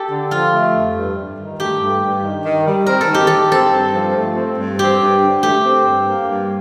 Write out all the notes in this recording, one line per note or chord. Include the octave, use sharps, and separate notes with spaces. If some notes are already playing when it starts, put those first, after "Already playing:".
Already playing: G4 A4
D3
F3 F4
A3
F2
G2
G2
D#3
A3 G4
G2
G2
D#3
D#3
G3
C4 A#4
A4
D#3
G4
D#3 A4
C4 A4
G2
F3
A3
C4
G2
C4 G4
G2
D3
A3 G4
C4
G2
A#3
G2